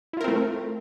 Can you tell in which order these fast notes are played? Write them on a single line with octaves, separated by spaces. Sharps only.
E4 F4 A#4 C4 A3